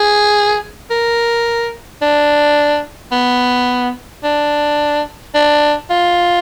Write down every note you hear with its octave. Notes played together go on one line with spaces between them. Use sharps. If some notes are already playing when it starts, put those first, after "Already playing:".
Already playing: G#4
A#4
D4
B3
D4
D4
F4